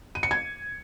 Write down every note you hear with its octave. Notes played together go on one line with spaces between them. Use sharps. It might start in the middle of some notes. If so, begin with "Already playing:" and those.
D#7
C#7
G#6